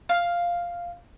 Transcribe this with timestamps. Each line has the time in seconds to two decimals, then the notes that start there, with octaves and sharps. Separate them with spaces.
0.09 F5